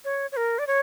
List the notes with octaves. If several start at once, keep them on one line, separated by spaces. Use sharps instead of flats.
C#5
C#5
A#4
D5
C#5